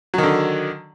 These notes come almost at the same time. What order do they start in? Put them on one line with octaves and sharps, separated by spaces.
F#3 D#3 D3